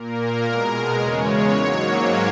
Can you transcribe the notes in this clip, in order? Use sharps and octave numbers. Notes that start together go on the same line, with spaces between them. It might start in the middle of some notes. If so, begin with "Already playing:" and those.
Already playing: A#2 A#3 A#4
B2 G#3
E2 C#3 G#3 C#5
G#2 F#3 A#3